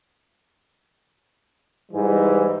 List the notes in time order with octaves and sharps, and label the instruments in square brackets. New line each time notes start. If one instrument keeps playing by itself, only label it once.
[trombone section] G#2 E3 G3